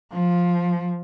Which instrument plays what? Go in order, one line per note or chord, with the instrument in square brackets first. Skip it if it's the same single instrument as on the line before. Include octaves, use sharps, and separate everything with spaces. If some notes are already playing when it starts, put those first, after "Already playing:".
[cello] F3